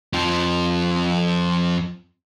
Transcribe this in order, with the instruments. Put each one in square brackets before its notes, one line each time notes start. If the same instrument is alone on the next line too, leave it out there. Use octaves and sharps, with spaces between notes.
[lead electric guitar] F2 F3